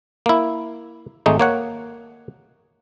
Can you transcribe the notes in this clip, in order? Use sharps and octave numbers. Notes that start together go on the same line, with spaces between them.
A#3 E4
G#1 G#3 A3 D#4
A#3 C#5 F#5